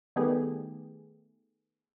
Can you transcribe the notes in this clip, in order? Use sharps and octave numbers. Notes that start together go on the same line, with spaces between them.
D#3 G3 A3 B3 G4 G#4